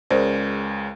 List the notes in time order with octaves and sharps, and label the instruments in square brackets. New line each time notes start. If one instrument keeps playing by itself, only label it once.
[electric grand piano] C#2 C#3 G#3 [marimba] A#4 D5 [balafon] C5